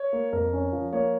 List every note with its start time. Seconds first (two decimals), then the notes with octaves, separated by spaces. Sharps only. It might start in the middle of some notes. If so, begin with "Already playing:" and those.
Already playing: C#5
0.13 A#3
0.33 F2 A#4
0.53 C#4
0.73 F3
0.93 A#3 C#5